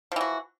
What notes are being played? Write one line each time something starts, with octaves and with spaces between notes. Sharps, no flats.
E3 F3 F#4